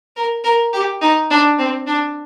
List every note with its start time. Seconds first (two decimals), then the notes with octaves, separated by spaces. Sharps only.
0.16 A#4
0.44 A#4
0.73 G4
1.01 D#4
1.30 D4
1.58 C4
1.87 D4